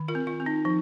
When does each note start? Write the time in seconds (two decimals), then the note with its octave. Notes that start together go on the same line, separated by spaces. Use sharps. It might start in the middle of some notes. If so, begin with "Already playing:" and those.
Already playing: D#3
0.08 F4 A#4
0.15 C4
0.27 F4
0.40 C4
0.46 D#4
0.65 F3 D#4